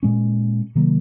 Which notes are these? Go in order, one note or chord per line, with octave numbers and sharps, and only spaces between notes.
A#2 G#3 C#4
C3 D#3 F#3 A#3